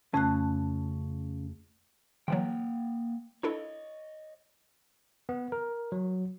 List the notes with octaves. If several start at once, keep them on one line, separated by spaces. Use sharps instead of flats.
F2 C#3 A3 F#6
D3 E3 F#3 A#3 F#5 G5
D4 E4 A4 C#5 D#5
B3
A#4
F#3